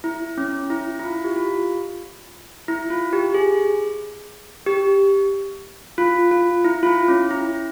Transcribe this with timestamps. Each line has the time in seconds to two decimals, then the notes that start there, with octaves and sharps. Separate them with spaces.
0.04 E4
0.38 C#4
0.70 E4
0.99 E4
1.03 F4
1.25 G4
1.36 F4
2.68 E4
2.90 F4
3.13 G4
3.34 G#4
4.67 G4
5.98 F4
6.31 F4
6.64 E4
6.83 F4
6.86 E4
7.08 C#4
7.31 E4